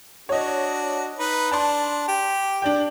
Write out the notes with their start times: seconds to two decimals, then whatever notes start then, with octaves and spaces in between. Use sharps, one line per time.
0.29 D4 F#4 C#5 D#5
1.19 D#4 B4
1.51 D4 A5 C6
2.08 G4
2.62 D4 D5 G5